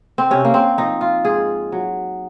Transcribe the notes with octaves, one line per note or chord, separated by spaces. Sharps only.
C4
C3 C#4
A#3
C4
F3 D#4
F4
G#2 G#4
F#3